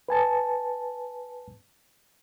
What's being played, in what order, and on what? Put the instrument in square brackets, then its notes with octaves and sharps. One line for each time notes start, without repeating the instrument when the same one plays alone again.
[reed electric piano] B4 G#5 A5